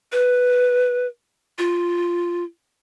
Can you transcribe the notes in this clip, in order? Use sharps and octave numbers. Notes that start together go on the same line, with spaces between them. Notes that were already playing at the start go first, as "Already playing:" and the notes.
B4
F4